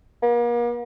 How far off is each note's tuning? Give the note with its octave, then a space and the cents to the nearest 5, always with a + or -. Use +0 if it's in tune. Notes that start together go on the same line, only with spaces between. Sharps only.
A#3 +40